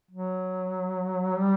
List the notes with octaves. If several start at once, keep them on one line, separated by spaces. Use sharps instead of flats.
F#3
G3